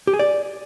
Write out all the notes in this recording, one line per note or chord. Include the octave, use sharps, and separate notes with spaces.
G4
G#4
D5